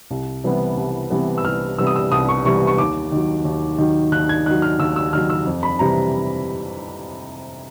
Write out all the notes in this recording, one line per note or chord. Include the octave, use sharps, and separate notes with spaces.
C2
C3 E3 G3 B3
C2
C3 E3 G3 B3
E6
C2 F6
C3 E3 G3 B3 E6
D#6
E6
C2 D#6
C#6
C3 E3 G3 B3 C#6
C#6
D#2 D6
D#3 F#3
D#2
D#3 F#3
D#2 F#6
G#6
D#3 F#3 F#6
F6
D#2 E6
E6
D#3 F#3 F6
E6
F2
B5
C3 E3 G3 A#5